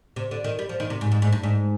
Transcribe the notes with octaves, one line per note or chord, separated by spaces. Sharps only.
C3
D3
D#3
G3
F3
D#3
C3
G#2
G#2
G#2
G2
G#2